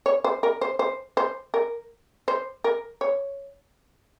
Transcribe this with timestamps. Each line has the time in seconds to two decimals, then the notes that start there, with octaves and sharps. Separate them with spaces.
0.06 C#5
0.24 C5
0.43 A#4
0.61 C5
0.79 C5
1.17 C5
1.54 A#4
2.28 C5
2.64 A#4
3.01 C#5